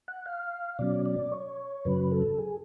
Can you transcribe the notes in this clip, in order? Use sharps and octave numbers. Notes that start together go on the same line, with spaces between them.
F#5
F5
B2 F#3 C#4 D5
D5
C#5
F#2 C#3 F#3 B4
A4
G#4